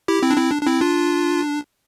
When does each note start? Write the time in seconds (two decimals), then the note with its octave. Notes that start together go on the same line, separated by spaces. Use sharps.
0.08 E4 G4
0.22 C4 E4
0.31 D4
0.37 C4 E4
0.51 D4
0.62 D4
0.66 C4 E4
0.81 D4 F4